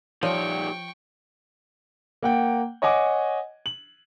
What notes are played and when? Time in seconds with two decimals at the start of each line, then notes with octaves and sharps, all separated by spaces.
0.23 F3 D#4 G4 C#5 D5 G5 C#6
2.23 A#3 F#5 G5
2.82 C#5 D#5 F#5 G#5 D6
3.66 F#7